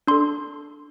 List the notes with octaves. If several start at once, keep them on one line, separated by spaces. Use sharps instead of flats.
D4 A4 C6